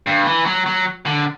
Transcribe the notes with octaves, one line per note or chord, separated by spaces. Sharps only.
G2
E3
F#3
F#3
D3